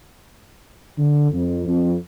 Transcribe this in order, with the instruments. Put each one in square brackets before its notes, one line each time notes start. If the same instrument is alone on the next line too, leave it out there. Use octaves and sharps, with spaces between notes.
[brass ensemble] D3
F2
F2